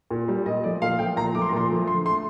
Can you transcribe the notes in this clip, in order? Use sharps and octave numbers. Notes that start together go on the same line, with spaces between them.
A#2
G3
A#2 D#5
F3 A3 D5
A#2 F5
F3 A3 G5
A#2 A#5
F3 A3 D6
C6
A#5
A#2 C6
F3 A3
D3 C6
A3 C6